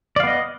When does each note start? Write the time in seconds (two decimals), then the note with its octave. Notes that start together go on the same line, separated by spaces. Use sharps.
0.16 D5
0.20 F5
0.24 B3
0.27 D#5